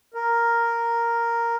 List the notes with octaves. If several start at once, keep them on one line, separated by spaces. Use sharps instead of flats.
A#4